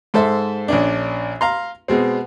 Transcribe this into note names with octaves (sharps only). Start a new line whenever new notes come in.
G#2 A4 C5 E5
A#1 C#4 D4
F5 A#5 C6
B2 G#3 C4